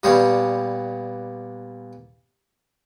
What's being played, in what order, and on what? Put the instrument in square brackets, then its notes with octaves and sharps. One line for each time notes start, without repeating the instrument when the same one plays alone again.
[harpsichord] A#2 G3 B3 G4 C#5 F5